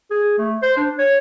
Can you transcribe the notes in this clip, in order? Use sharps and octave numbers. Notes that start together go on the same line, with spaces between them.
G#4
A3
C5
D4
C#5